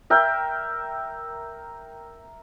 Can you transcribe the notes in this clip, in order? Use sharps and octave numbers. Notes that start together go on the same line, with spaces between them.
A#4 E5 G5